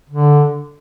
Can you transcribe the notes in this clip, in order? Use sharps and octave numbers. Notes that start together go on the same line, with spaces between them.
D3